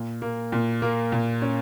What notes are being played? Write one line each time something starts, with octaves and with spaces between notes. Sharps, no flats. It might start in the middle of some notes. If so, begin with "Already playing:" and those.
Already playing: A#2
A#3
A#2
A#3
A#2
C#4